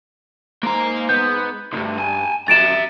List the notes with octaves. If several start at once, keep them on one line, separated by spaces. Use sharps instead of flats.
G#2 A#3 A#5
B3 G6
B1 G2 D3 A3
G#5 A5
F2 F#3 E5 A#5 A6 D7 E7